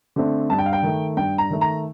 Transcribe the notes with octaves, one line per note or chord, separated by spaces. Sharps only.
D3 A3 C4
G2 A5
G5
F5
G5
D#3 A3
G2 G5
A#5
D#3 A3
A#5